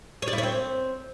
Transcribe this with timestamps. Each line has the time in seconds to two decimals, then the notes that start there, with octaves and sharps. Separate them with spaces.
0.22 C#5
0.28 D5
0.33 E4
0.38 C#5
0.43 C4